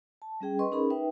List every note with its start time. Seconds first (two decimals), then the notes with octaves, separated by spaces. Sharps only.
0.22 A5
0.40 G3 C#4 G#4 G5
0.59 B4 D#5 C6 C#6
0.72 C#4 D#4 G#4 A#4 B5
0.90 D#4 B4 E5 G5